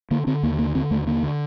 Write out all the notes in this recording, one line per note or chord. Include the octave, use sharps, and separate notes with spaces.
D3 A#3
D3 C4
D#2 A#3
D3 A#3
D3 C4
D#2 A3
D3 A#3
D3